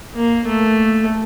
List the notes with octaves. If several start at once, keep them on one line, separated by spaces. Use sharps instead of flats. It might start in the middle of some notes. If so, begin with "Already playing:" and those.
A#3
A3